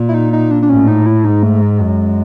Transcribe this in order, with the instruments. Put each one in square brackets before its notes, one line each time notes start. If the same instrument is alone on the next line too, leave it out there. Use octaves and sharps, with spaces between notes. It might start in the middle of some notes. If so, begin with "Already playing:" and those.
Already playing: [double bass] A#2
[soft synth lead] E4
D#4
D#4
D4
D4
[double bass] A2 [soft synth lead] C#4
[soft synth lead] D#4
E4
[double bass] G#2 [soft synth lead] D#4
[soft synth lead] A3
G#3
[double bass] F#2